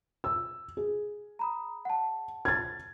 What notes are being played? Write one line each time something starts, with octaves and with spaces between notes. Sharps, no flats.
E6
G#4
A#5 B5 D#6
F#5 A5
G#6 A6